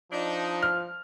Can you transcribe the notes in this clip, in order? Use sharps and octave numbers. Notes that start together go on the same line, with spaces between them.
F3 D4 D#4
F6